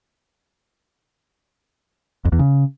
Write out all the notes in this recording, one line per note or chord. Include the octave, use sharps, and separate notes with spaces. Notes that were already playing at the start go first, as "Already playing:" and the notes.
F2
E2
C#3